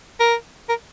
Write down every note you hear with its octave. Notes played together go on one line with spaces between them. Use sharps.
A#4
A#4